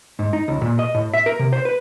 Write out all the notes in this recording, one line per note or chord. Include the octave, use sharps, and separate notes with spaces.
G#2
D#4
C#2
A#2
D#5
A2
E5
A#4
C3
C5
B4